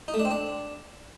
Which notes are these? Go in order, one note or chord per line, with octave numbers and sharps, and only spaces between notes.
D#4
A3
D4
C4
D4